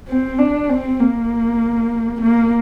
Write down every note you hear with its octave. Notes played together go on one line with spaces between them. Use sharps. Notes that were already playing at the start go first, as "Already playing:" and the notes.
C4
D4
C4
A#3
A#3